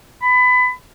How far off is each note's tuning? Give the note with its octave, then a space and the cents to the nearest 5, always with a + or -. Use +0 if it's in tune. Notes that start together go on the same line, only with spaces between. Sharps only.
B5 +25